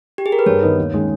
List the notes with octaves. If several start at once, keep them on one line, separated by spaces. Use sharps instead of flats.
G4
G#4
A#4
B4
G2 C#5
D#3 G3 B3 D#4
D#2
D#3 G#3 C#4 G#4